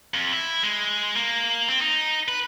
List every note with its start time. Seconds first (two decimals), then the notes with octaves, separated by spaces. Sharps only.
0.14 F2
0.32 E4
0.63 G#3
1.16 A#3
1.68 C4
1.82 D#4
2.28 B4